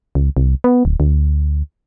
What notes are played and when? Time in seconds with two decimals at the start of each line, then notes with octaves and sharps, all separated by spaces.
0.15 C#2
0.37 C2
0.64 B3
0.85 D1
1.00 D2